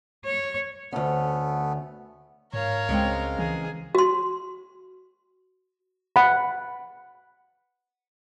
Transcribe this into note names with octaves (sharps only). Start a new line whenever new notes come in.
C#5
D2 A3 B3 C#4
G#2 A#4 C#5 F5
C#2 C#3 G#3 C4
E3 G#4
F#4 C6
F#5 B5